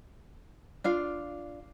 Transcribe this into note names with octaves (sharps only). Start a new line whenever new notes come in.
D4 F4 F5